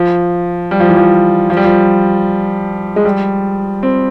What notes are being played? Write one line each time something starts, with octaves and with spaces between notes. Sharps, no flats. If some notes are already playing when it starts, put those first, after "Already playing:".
Already playing: F3
G3
F3
E3
F3
F3
G3
F3
G#3
G3
C4